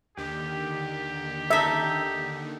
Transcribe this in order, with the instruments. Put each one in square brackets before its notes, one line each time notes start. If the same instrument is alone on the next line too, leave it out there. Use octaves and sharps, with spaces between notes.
[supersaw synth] D#2 D3 D#3 [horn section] G4
[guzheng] D#4 A4 [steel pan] E5